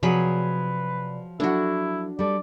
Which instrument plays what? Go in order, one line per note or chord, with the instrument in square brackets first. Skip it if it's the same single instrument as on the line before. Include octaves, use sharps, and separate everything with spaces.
[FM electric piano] C3 D5 [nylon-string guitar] F3 [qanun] F#3 G#4 B5 [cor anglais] B4
[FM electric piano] F#3 A4 [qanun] D4 F#4 [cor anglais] E4
[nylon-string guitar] G3 A4 [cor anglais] D5